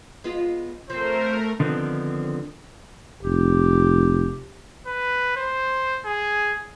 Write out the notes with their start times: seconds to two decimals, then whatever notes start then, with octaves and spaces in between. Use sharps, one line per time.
0.24 G#3 B3 F4
0.90 F3 A3 C4 A#4 C5
1.59 D3 D#3 F3 B3 C4
3.23 F1 G4
4.87 B4
5.36 C5
6.05 G#4